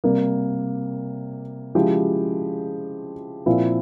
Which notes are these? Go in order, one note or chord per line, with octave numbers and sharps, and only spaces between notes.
C3 G3 A#3
C#3 F3 G#3 E4 G4
A#2 F3 C4 E4